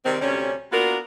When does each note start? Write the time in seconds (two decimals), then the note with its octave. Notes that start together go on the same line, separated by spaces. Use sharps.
0.05 C3 D#3 G3 G#3 C4
0.21 D2 C3 G3 C#4
0.73 A#3 B3 D4 F4 F#4 A#4